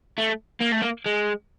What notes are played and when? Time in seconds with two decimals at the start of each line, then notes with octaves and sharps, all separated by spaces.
0.18 A3
0.61 A#3
0.72 A3
0.82 A#3
1.06 G#3